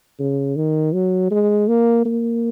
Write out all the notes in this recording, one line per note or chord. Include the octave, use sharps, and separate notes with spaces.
C#3
D#3
F#3
G#3
A#3
A#3